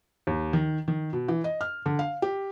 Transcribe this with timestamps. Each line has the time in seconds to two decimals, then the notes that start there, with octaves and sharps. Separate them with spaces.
0.27 D#2
0.53 D#3
0.88 D#3
1.13 B2
1.28 E3
1.44 D#5
1.61 F6
1.86 D3
1.99 F5
2.22 G4